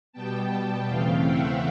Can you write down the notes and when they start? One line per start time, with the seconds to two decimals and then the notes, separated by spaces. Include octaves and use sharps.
0.13 B2 G3 B3 G5 A5
0.87 E2 C#3 E3 A3 C4 F5 G5
1.23 E5 F#5